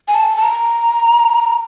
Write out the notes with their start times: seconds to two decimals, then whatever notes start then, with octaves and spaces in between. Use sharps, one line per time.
0.08 G#5
0.14 A5
0.37 A5
0.43 A#5